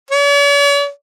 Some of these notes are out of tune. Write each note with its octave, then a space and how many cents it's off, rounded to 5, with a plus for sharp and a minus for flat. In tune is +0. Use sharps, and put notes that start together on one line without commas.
C#5 +45